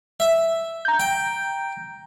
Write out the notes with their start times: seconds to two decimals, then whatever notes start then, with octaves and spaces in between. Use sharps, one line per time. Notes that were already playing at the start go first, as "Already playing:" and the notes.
0.20 E5
0.85 A#5 G6
1.00 G5